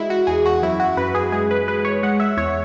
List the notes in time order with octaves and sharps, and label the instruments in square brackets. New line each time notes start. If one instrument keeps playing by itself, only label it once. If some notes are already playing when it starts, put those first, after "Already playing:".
Already playing: [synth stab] E3 G#3 E4 F#4
F#4
E2 G#4
F#4
F#2 E4
F#4
F#2 B4
G#4
G#3 G#4
B4
G#3 B4
C#5
G#3 F#5
E5
E2 C#5